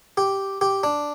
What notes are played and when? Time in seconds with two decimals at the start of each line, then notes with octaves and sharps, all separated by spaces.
0.17 G4
0.61 G4
0.83 D4